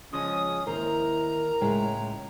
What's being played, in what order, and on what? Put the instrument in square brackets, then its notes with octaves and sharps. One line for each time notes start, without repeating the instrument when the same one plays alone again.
[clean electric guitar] C#3 F3 G#3 [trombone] C#4 [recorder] D#6
[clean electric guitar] D#2 [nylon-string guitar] E4 C5 [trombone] A#4 [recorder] A#5
[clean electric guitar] C#2 [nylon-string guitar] A2 G#3